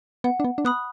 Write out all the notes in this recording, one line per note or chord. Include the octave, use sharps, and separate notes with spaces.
B3 F#5
D4
B3
D4
B3 B5 D#6 F#6